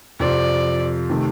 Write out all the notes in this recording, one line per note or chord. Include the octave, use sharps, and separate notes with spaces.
F2 C3 F3 C4 D5
C3 D#3 A3